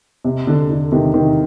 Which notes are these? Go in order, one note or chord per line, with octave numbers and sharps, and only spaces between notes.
C3
D3
D3
C3 D#3
C3 D#3